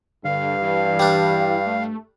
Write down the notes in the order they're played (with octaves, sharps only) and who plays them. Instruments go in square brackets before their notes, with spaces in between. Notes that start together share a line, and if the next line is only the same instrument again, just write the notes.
[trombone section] G2 [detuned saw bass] D3 [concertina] F5
[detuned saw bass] E3
[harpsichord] G3 D4
[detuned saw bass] A3